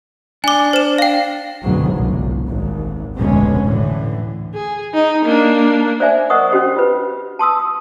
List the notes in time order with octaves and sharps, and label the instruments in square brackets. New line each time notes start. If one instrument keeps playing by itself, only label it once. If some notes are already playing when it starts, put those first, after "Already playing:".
[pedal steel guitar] D4 [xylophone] G#5 D6
[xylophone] C5 E7
F5 G5
[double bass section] F#1 D2 G#2 B2 E3 F#3
G1 C2
G#1 D#2
F1 D2 B2 D3 G#3 C#4
A2 D3 E3
[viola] G#4
D#4
A#3 D4
[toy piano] C5 D5 E5 G#5
A#4 C5 D#5 F#5 C#6 D#6
C#4 D4 F#4 G4 C5 D#5
F4 B4
A5 C6 D#6 E6